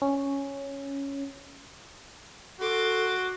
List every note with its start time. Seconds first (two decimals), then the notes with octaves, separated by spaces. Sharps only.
0.02 C#4
2.61 F#4 A4 C6 D6